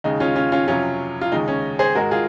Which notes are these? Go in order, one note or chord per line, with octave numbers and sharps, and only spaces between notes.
D#2 C#3 G#3 D#4
C#4 F4
C#4 F4
C#4 F4
F2 C3 F#3 C#4 F4
F4
D#2 C#3 G#3 D#4
C#4
G#4 C5
G#2 D#3 G#3 F#4 A#4
F4 G#4